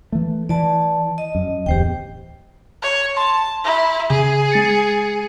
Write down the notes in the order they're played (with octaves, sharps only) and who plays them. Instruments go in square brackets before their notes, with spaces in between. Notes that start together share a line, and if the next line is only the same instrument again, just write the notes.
[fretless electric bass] E3 A3
[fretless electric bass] E3 [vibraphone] D5 A5
[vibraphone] D#5
[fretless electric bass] F#2
[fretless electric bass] D1 E2 [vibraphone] G4 C5 G5
[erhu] C#5
[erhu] A5 [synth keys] C6
[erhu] E4
[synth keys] C#3 [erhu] G#4
[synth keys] G#3 A6 C#7